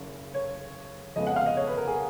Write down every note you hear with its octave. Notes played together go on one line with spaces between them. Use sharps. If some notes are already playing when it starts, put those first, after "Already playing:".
Already playing: F#1 C#3
C#5
F2 C#3 G#3 B3 D#5
F#5
F5
D#5
C#5
B4
A#4
G#4